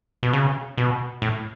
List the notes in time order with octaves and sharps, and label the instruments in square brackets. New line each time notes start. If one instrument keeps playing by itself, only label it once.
[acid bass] B2
C#3
B2
A2